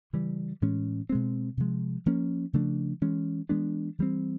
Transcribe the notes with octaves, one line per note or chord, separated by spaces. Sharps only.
C#3 E3 G3
A2 E3 G#3 C#4
B2 G#3 C4
C3 F3 G#3
F3 A#3 C#4
C#3 F3 A3 D4
E3 G#3 C#4
E3 G#3 B3 D4
E3 G3 C4